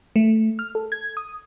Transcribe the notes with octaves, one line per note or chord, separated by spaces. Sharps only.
A3
F6
A4
G#6
D#6